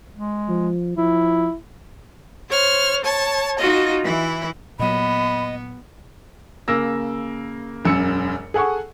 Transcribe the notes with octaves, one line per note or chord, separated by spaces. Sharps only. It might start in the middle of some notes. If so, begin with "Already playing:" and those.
G#3
F3
F3 E4
C5 C#5 F6
C#5 A5
D#4 F4 F#4 D#5
E3 E4
A#2 F#3 B3 D#5 B5
C#3 A#3 E6 A#6
E1 F#2 E6 C#7
G#4 A4 F#5 G#5 C#6